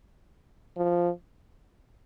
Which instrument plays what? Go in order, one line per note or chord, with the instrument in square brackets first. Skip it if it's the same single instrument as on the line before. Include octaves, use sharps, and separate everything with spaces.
[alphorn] F3